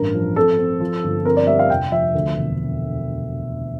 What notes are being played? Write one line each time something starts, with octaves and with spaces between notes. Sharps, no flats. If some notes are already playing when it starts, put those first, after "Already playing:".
Already playing: A1 G2 A#4
F3
C4 A4
C4
F3
G1
C4 A#4
D5
G3 E5
F5
F1 G5
F3 E5
D2
E1